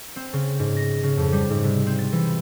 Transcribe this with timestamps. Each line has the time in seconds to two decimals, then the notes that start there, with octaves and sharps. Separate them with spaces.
0.16 C4
0.33 C#3
0.59 G#2
0.77 A#6
1.03 C#3
1.17 F2
1.32 G3
1.50 G#2
1.64 C3
1.86 C4
1.99 A6
2.12 E3